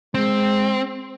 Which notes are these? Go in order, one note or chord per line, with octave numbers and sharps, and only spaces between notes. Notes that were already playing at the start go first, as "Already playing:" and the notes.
G#3 C4